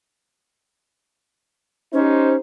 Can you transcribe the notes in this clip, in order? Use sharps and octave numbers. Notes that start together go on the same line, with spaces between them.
C#4 D#4 G4 C5